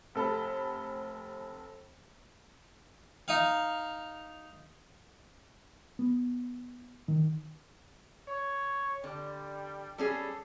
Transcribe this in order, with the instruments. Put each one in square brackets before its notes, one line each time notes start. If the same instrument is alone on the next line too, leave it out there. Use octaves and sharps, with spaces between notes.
[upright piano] F1 A4 B5
[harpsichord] D#4 F5
[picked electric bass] B3
D#3
[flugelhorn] C#5
[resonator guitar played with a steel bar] D3 [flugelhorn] G3
[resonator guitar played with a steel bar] G3 C#4 G#4 [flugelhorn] A4